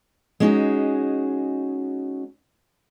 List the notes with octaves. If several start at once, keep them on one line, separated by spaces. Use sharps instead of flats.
G#3 B3 C#4 D#4 F#4 G#4